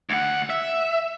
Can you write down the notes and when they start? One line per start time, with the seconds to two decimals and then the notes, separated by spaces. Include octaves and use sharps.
0.10 D2 F#5
0.50 E5